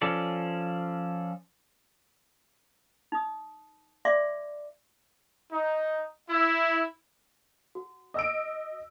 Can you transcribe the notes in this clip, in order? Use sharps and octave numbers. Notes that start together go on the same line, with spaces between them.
F3 C#4 A4 D5
D#4 D#6
D5 E5 C6 D6
D#4
E4
F#4
D#5 E6 D7